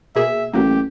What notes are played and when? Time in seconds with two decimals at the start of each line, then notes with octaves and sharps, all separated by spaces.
0.16 B2 A#3 G#4 E5
0.54 A1 F#3 A#3 G4